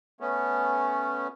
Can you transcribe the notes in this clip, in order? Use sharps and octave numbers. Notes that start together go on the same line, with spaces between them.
A3 B3 C#4